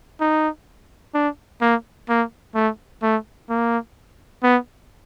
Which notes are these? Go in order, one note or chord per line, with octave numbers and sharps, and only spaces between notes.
D#4
D4
A#3
A#3
A3
A3
A#3
B3